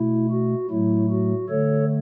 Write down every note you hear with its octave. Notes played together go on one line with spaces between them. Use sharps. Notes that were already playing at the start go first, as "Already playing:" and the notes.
Already playing: B2 A3 E4
F#4
A2 F#3 A3 E4
F#4
D3 A3 A4 C#5